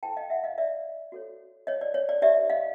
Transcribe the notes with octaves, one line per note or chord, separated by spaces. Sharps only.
E4 A4 C5 G5 A5
D#5 F5
E5 F#5
D#5 F5
D5 E5
F#4 A4 C#5
C#5 D#5
D5
C#5
D5
D#4 G4 B4 D5 E5
D#5 F5